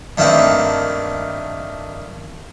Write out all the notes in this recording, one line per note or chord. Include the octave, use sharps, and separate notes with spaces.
G2 D#3 A3 A#3 C4 B4